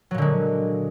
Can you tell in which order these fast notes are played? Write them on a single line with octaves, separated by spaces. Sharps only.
F#3 A#2 D3 G#3